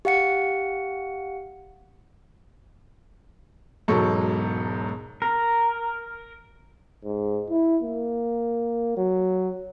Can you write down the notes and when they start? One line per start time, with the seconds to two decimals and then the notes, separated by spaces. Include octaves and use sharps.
0.05 G4 F5 F#5 C#7
3.88 E1 G#2 F#3 A4 C#6
5.22 A#4
7.04 G#2
7.50 E4
7.83 A#3
8.97 F#3